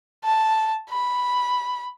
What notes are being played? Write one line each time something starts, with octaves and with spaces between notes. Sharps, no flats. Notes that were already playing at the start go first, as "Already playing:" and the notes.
A5
B5